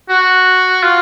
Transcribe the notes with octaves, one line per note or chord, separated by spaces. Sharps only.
F#4
F4